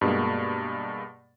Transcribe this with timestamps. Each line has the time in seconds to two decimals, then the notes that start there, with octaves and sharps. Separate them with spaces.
0.01 G2 B2 G#3 A#3